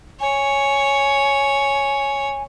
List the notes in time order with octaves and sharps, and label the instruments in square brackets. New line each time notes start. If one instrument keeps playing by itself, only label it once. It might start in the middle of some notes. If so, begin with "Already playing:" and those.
[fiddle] C#5 [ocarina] G#5